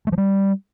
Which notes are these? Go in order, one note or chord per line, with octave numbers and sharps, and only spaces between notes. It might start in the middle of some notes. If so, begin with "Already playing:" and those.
A3
F3
G3